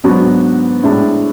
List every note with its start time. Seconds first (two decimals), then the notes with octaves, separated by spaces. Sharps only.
0.04 G#2 F#3 B3 D4 F#4
0.83 A2 G#3 D4